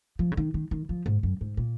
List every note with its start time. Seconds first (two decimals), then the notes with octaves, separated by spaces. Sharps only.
0.19 F3
0.32 C#3
0.37 D#3
0.54 D#3
0.71 D#3
0.89 F3
1.06 G#2
1.23 F#2
1.41 G#2
1.57 A#2